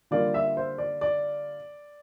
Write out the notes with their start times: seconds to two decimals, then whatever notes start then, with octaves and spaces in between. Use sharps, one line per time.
0.11 D3 G3 A#3 F4 D5
0.34 E5
0.57 C5
0.78 D5
1.01 D5